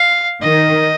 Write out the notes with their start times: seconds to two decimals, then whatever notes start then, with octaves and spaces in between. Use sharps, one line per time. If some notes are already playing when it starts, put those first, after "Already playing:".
Already playing: F5
0.42 D#3 D#5